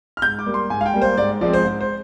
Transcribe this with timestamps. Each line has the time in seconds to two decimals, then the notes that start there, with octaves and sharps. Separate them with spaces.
0.17 F6
0.22 G#2 G6
0.39 D6
0.46 G3 A#3
0.54 C6
0.70 G#2 G#5
0.81 F5
0.86 G5
0.94 G3 A#3
1.02 C5
1.17 G#2 D5
1.41 F3 G#3 C4 D5
1.53 C5
1.65 G#2
1.81 C5